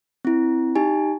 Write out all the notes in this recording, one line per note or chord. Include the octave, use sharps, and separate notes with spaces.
C4 E4
D#4 G4 G#5